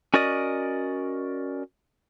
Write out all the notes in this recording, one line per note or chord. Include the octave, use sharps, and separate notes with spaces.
C#4 F#4 A#4 D5 D#5